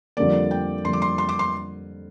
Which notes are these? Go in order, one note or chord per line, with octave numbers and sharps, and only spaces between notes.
F2 D3 G3 A#3 D5
G5
F2 D3 G3 A#3 C6
D6
C6
C6
D6
C6